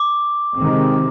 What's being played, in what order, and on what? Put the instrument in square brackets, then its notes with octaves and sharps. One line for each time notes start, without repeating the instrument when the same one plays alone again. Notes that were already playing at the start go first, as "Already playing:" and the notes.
Already playing: [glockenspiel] D6
[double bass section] C3 D#3 G#3 C4